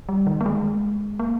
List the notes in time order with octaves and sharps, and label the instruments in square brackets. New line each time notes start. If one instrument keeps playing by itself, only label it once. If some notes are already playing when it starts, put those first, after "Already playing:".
[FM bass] G3
D#3
A#3
G#3
A#3